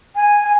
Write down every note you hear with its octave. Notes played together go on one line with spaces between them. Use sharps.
G#5
G#5